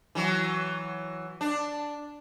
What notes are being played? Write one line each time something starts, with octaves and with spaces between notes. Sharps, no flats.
E3 F#3
D4